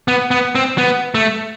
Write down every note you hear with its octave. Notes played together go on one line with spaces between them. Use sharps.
B3
B3
C4
B3
A3